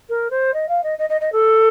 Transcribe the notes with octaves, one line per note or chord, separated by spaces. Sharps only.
A#4
C5
D#5
F5
D#5
D#5
D#5
D#5
A4